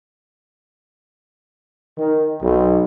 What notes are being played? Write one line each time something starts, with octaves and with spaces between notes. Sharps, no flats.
D#3
B1